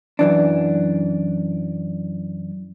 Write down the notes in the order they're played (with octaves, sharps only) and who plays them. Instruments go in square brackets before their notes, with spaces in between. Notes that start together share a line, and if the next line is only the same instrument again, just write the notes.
[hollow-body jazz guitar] F#2 E3 D4